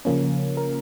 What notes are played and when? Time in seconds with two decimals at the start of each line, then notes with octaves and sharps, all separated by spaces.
0.05 C#3 F3 A#3 C#4
0.57 A#4